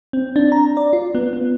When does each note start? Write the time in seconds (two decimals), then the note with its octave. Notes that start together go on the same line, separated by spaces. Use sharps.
0.13 C4
0.36 D4
0.52 A#5
0.77 D5
0.93 F4
1.15 B3
1.33 B3